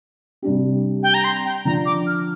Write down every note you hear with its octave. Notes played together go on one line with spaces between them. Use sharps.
C3 G3 D4 G4
G5
A#5
C6
G5
D3 F3 D4 A#5
D6
F6